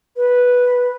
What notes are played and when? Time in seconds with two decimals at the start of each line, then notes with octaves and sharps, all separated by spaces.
0.17 B4